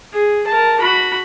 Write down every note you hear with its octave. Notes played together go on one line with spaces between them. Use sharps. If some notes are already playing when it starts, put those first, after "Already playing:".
G#4
A#4 A5
F#4 B5